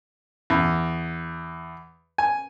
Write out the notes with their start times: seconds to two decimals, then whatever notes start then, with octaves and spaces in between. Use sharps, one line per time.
0.50 E2
2.18 G#5